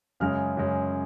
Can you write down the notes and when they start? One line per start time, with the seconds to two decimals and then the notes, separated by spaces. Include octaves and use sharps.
0.20 F#2 C#3 G#3 C#4 F6
0.57 F#2 C#3 G#3 C#4